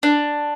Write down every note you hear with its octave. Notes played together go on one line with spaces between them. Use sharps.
D4